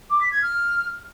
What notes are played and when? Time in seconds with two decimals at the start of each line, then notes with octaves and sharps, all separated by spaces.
0.10 D6
0.20 B6
0.31 G#6
0.42 F6